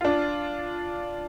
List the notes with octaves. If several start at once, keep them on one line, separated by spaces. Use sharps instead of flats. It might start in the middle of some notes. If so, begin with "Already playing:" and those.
D4 F4